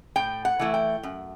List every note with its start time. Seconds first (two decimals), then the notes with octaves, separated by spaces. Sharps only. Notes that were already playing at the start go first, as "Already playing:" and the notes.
0.16 A2 G5
0.45 F#5
0.59 E3 A3 E4
0.74 G5
1.03 F#2